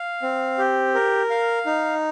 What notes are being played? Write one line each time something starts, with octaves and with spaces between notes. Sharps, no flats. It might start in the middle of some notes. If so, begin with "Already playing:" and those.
Already playing: F5
C4
G4
A#4
F5
D#4